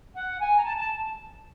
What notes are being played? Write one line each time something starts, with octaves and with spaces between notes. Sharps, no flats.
F#5
G#5
A#5
A5
A5